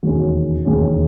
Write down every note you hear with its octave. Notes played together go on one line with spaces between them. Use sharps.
E1 D#2 D#3 G#3 C#4 F#4
E1 D#2 D#3 G#3 C#4